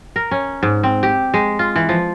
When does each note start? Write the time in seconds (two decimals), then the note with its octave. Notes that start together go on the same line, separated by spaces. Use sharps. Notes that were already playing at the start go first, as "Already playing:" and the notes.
0.16 A#4
0.31 C#4
0.63 G#2
0.83 C4
1.03 G4
1.34 G#3
1.59 F4
1.76 E3
1.89 F3